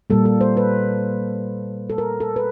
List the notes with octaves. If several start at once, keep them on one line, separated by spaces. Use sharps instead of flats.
A#2 G3 A#3 A4
A4
C5
B4
A4
A#4
A4
B4